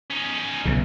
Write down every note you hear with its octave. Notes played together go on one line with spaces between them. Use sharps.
C#4 D#4
B1 C#3